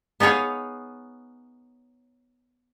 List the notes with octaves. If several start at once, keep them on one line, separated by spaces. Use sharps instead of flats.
B3 D#4 G#4 C#5 F5